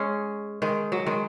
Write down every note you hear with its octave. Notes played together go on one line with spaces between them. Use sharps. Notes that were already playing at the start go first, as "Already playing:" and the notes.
Already playing: G#3 C#4
D#3 G#3
F#3
D#3 G#3